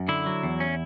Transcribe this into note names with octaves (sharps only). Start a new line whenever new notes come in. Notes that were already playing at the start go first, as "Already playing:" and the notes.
Already playing: F#2
D3 E4
F#3
E2
C#4